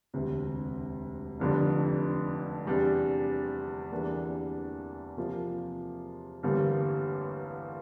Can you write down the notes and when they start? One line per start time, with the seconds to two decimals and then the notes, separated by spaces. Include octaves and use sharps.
0.14 E1 D2 C3
1.39 F1 F2 D3 G3 D4
2.65 E2 C3 G3 D4
3.91 E2 E3 G3 A#3 D4
5.17 C3 F3 A#3 F4
6.43 A1 G2 D3 G3 A#3